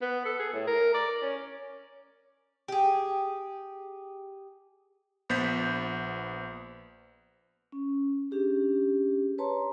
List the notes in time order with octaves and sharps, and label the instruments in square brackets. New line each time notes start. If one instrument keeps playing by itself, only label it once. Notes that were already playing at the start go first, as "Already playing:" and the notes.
[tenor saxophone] B3
A4
G#4
A2
A#4
D5
C#4
[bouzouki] G4 G#4
[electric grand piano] A#1 B3 C5 G6 A6 B6
[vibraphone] C#4
C#4 D4 G4 G#4
B4 C#5 A5 A#5 C6